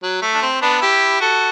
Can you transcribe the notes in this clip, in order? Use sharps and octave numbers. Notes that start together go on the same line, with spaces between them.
F#3
A3
D4
C4
B3 D4
E4 G4
F#4 A4